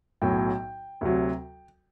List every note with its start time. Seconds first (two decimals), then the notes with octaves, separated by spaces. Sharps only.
0.22 B1 A2 F#3 G5
1.01 D2 C3 F#3